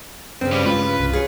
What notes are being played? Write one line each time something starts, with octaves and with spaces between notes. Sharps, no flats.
G2 C#3 C4
G3 B4
G#3 F4 B4
C2
G#4 C#5